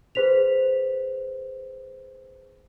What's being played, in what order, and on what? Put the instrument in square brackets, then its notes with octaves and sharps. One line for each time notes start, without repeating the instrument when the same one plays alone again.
[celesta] G#4 B4 C5 B6 F7